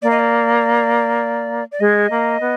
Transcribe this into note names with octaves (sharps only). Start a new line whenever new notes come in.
A#3 D5
D#5
D5
D5
G#3 D#5
A#3
B3